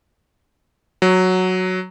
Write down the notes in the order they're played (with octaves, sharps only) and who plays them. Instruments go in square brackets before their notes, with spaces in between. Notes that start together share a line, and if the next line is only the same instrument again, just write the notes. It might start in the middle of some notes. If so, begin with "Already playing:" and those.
[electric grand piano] F#3